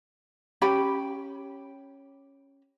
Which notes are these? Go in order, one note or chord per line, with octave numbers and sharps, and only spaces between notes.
C#4 G4 G5 B5